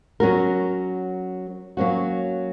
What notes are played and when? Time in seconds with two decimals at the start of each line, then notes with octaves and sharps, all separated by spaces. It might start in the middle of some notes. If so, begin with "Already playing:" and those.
0.20 F#3 C#4 F#4 A#4
1.77 F#3 A#3 C#4 F#4